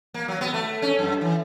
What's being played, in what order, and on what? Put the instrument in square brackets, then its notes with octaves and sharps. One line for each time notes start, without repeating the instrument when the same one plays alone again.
[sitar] A#3
F#3
B3
A3
C#4
F#2
E3